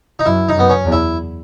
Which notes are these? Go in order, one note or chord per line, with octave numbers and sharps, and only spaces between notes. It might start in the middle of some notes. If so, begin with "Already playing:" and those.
D#4
F#2 E4
D#4
F#2 B3
C#4
E2
E4